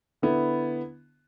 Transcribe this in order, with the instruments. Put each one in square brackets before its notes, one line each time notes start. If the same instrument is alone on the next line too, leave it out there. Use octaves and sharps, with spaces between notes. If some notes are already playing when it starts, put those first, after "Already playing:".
[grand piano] D3 B3 E4